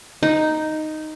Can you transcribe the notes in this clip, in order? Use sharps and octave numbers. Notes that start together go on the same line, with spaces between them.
D#4